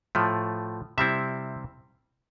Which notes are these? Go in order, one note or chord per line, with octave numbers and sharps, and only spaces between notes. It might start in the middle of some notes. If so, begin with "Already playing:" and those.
A2 F3 A3
C3 G3 C4 E4 E5